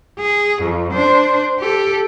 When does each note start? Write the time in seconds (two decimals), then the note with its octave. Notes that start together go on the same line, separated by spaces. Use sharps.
0.19 G#4
0.62 F2
0.93 D4 C5
1.59 G4 A4